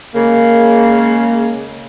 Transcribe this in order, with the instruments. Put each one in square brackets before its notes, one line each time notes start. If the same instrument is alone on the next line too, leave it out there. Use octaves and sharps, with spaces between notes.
[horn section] C#3 G#3 A#3